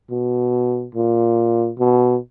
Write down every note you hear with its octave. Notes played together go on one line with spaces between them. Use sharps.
B2
A#2
B2